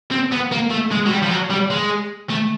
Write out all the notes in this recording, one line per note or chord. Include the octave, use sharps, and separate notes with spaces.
C4
B3
A#3
A3
G#3
F#3
G3
F3
F#3
G3
G#3
A3